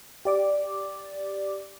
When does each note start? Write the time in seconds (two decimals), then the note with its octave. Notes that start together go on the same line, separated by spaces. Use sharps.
0.25 G4 D5 D6